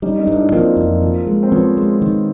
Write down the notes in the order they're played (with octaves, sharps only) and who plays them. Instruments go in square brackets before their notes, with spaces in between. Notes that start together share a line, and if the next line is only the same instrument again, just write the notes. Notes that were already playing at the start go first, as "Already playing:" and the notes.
[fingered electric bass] G3 [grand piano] C#4 D#4
[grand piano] C#4 D#4
[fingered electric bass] G2
[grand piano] D4 E4
[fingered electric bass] F3 [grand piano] A#3 C4
[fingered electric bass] F2
F3
G#3
[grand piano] C4
[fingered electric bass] F3 [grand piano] B3 C#4
[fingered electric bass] G#3
D#3